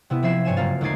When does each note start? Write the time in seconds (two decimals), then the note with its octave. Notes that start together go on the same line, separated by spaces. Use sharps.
0.10 C3 B3 E4
0.23 F3 C4 E5 G#6 C7 E7
0.45 G2 C#5 G#5 E7
0.56 F#1 A#3 F4 F5 A6
0.81 D2 G#3 D#4 D5 G#6 C7